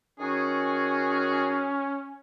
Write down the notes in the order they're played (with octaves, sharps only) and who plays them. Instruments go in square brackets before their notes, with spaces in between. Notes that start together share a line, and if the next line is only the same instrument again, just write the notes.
[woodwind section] D#3 F#4 G#4 [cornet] C#4